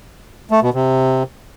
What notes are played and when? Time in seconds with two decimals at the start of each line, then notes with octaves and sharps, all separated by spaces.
0.51 A3
0.62 B2
0.74 C3